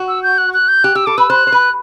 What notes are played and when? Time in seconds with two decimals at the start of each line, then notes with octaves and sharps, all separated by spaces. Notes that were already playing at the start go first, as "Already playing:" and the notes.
Already playing: F#4
0.08 E6
0.23 G6
0.38 F#6
0.54 F#6
0.68 G6
0.84 G4 F#6
0.95 G4 E6
1.06 A4 D6
1.17 B4 E6
1.30 C5 F#6
1.47 C5
1.52 B4